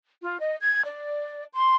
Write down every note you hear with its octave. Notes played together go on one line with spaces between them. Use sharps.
F4
D#5
G#6
D5
C6